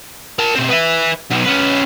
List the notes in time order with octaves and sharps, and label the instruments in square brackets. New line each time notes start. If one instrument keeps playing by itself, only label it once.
[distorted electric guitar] A#4 A5
B2 C4
B4 E5
B1 B2
C#4 B4